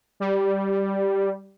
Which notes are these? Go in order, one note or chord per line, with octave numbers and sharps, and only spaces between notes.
G3